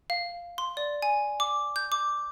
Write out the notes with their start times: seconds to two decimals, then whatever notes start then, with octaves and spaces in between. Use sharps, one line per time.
0.10 F5
0.58 C6
0.77 D5
1.02 G#5
1.40 D6
1.76 G6
1.92 D6